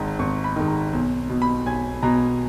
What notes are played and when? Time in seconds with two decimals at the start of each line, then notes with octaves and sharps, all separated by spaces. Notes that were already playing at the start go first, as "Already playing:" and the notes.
Already playing: G#1 G#2 D#3
0.19 G#1 C#6
0.44 B5
0.56 G#2 D#3
0.68 A#5
0.93 B1
1.29 B2
1.42 B5
1.66 B1 G#5
2.03 B2 A#5